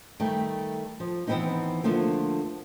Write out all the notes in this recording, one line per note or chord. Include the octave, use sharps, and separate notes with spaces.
D#3 G3 A3
F3
D#3 E3 G#3 B3 C4 D#4
D3 F3 A3 A#3